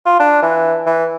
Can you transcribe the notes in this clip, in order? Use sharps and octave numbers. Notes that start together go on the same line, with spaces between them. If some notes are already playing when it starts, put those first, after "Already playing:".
F4
D4
E3
E3